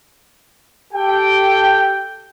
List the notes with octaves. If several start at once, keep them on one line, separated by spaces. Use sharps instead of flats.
G4 A4 G5